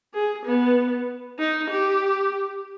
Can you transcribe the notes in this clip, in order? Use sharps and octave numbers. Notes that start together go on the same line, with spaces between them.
G#4
B3
D#4
G4